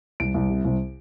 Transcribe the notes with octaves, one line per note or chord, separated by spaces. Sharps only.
C2 D7
C2
C3
C2